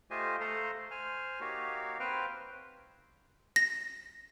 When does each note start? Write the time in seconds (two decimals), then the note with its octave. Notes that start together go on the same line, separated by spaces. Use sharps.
0.11 A3 F4 G4 C5 D#5 G#5
0.40 A3 A4 C5 F5 A#5 C6
0.91 C5 G#5 F6
1.40 A#3 D#4 F#4 G4 C#5 F5
2.00 C4 B4 C5 F5 G5 F6
3.56 A#6